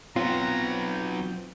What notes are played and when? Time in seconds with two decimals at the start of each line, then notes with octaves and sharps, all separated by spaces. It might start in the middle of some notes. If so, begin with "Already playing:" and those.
0.16 F#3 B3 C4 F4 A#5
0.90 G6